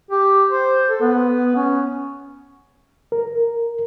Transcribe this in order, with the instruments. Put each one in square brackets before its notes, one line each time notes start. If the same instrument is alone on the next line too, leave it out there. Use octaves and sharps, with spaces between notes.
[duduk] G4
C5
A4
B3
C#4
[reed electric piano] A#4